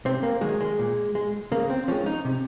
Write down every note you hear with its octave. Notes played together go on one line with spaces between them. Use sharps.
C3 C4
A#3
D#3 F#3 G#3
G#3
A#2
G#3
C#3 A#3
C4
F3 G#3 C#4
D#4
C3